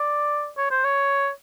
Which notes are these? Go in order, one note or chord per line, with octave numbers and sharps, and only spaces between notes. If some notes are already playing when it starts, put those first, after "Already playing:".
Already playing: D5
C#5
C5
C#5